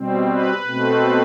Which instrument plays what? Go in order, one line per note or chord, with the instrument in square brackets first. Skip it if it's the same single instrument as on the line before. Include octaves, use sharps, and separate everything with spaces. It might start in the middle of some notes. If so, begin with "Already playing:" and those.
Already playing: [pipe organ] B2 G3 C4
B4
B2 A3 C4